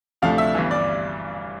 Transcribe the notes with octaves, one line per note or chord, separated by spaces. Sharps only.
D2 C3 F3 A3 D4 F5
E5
G1 G2 E3
D5